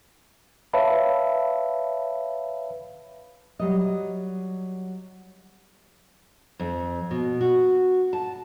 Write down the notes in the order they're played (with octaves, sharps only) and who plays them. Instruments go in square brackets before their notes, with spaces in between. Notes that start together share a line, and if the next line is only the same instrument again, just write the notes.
[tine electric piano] B4 C#5 E5 F5 A5 B5
[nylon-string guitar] F#3 G3 D#5
F2
B2
F#4
A5